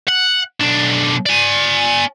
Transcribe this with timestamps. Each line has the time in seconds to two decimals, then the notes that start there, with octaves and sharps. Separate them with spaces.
0.09 F#5
0.61 B1 D4
1.26 D5 G#5